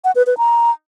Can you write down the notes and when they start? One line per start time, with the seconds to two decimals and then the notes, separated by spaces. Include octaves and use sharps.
0.04 F#5
0.16 B4
0.27 B4
0.38 A#5